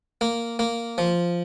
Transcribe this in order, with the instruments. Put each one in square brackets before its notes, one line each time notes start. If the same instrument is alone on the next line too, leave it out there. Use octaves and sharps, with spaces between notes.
[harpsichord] A#3
A#3
F3